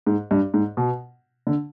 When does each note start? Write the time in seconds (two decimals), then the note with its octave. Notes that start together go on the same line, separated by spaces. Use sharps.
0.07 G#2
0.31 G2
0.54 G#2
0.77 B2
1.47 D3